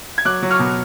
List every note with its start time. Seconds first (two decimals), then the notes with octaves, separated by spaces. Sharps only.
0.18 G#6
0.25 F#3 D6 F#6
0.42 F#3
0.51 C#6 F6
0.59 B2